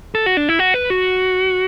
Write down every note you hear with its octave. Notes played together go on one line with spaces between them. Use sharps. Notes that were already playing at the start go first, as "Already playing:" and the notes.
A4
F#4
D4
E4
F#4
B4
F#4